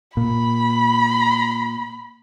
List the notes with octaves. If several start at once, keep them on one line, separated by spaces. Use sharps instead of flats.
A#2 B5